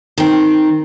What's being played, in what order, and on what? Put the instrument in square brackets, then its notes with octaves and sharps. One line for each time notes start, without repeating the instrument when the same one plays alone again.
[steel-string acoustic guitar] D#3 C4